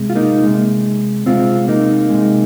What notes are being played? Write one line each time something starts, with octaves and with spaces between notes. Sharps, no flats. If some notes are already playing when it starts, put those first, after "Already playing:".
Already playing: C3 G#3
F4
A#3 D#4
C3 G#3
C3 G#3 C4 F4
A#3 D#4
C3 G#3